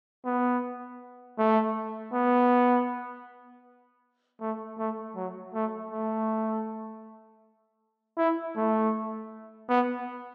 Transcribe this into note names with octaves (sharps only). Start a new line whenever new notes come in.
B3
A3
B3
A3
A3
F#3
A3
A3
E4
A3
B3